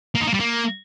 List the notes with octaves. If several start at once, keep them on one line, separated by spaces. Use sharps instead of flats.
A#3
D#4
A#3
G3
A#3